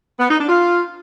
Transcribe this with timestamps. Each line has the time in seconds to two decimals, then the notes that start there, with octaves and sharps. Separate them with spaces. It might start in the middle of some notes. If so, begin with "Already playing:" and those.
0.19 B3
0.29 D#4
0.39 D4
0.49 F4